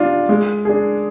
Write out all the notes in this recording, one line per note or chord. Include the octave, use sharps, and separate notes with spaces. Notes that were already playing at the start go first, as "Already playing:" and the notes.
Already playing: G3 D4 F4
G#3
D4 G#4